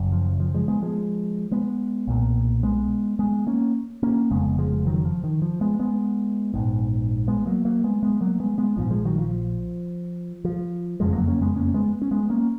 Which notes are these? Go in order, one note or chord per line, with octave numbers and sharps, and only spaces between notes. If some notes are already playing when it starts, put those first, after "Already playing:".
Already playing: F#1 F#2 C#3
F3
F3
F3 G#3
G#3 B3
F3 G#3
G#3 B3
B1 A#2
G#3 B3
G#3 B3
A#3 C#4
A#3 C#4
F1 F2 C#3 G#3 B3
F3 G#3
D#3 F#3
F3
D#3
F3
G#3 B3
G#3 B3
A#1 G#2
G#3 B3
F#3 A#3
F#3 A#3
G#3 B3
G#3 B3
F#3 A#3
G#3 B3
G#3 B3
A#1 G#2 F3
F3 G#3
D#3 F#3
F3
F3
F#1 F2 C#3 F3 G#3
F#3 A#3
A#3 C#4
G#3 B3
A#3 C#4
G#3 B3
C#4
G#3 B3
A#3 C#4